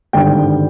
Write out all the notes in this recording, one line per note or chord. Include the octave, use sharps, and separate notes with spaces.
G#1 G2 D3 G5